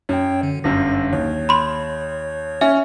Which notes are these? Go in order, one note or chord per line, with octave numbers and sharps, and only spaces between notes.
F#2 C#5 G5
D3
G1 F#2 A#6
D#2 C#5
B5 C6
C#4 E5